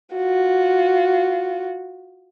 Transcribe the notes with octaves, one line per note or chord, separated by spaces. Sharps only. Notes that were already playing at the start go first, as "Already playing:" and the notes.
F4 F#4